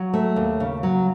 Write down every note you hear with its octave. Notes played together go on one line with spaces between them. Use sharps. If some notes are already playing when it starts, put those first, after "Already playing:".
Already playing: F#3
A3
D#2
C#3
F#3